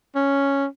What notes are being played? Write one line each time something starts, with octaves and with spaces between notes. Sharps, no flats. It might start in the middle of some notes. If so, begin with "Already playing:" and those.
C#4